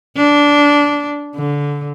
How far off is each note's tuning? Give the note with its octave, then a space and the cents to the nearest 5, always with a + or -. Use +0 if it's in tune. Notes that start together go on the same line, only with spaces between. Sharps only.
D4 -15
D3 -20